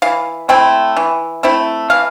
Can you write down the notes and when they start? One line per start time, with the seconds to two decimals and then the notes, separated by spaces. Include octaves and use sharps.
0.02 E3 F5
0.49 A3 C4 E4 G5
0.97 E3
1.43 A3 C4 E4
1.90 E3 F5